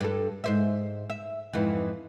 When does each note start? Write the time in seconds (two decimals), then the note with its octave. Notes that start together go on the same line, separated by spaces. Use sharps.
0.01 G2 A4
0.44 G#2 C5 E5
1.10 E5
1.53 F2 G#2 E3